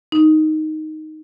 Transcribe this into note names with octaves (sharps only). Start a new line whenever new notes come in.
D#4